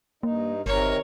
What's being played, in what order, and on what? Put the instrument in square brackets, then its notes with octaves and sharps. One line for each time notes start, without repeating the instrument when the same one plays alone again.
[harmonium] G2 D#4 [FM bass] A#3
[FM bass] G1 [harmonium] C3 D#3 A#4 [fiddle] C#5